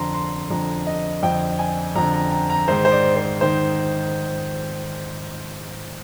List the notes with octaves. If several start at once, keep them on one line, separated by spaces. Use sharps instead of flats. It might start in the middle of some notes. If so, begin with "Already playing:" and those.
Already playing: F2 D3 A#5 C6
C6
F2 D3 A#5
D#5
F2 D3 G5
G#5
F2 D3 A#5
A#5
A#5
A#5
G#2 D#3 C5
C5
D5
C5
D#3 C5